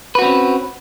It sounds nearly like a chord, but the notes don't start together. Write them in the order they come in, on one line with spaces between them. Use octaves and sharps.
B4 F#4 C4 C#4